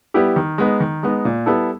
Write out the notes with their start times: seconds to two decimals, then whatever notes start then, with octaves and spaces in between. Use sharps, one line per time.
0.14 G3 B3 E4 G4
0.36 D#3
0.58 G#3 B3 D#4
0.80 D#3
1.03 G#3 B3 D#4
1.25 A#2
1.46 G3 B3 E4 A4